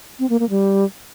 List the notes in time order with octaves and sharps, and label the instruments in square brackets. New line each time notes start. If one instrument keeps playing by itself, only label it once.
[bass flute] C4
A#3
A#3
G3